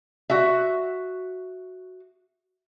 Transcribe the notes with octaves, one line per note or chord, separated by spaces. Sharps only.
F#4 E5